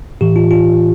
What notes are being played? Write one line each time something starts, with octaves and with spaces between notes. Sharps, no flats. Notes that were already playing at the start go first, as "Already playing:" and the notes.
A2 E3 G4
F4
F4